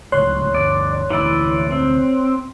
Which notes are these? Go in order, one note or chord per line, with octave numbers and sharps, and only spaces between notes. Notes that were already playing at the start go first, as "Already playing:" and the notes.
D1 C#2 A2 C#5 C6 F#6
G1 D2 G2 D5
F1 D2 E3 E4 D5
C4